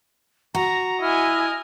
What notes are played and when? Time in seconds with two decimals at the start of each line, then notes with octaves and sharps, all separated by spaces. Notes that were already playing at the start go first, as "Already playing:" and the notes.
0.55 F#4 A#5
1.02 E4 D#5 G#5 F6